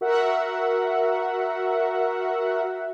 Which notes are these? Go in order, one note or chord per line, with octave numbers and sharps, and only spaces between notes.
F#4 A#4 E5 F#5